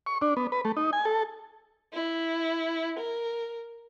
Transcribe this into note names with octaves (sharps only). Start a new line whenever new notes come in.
C#6
D4
B3
B4
A3
D#4
G#5
A4
E4
A#4